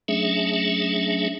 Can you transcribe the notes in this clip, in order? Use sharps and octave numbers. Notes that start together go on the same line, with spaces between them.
F#3 A3 C#4 D4 G#4 E5